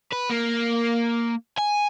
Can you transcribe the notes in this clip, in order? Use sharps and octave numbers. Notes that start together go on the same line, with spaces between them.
B4
A#3
G#5